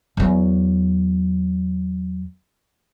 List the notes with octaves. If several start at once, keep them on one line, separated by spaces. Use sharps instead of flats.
E2 F#3